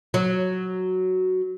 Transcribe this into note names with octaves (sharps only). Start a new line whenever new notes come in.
F#3